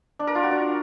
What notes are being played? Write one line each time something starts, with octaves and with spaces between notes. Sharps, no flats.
D4
A#4
F4
F#4
D4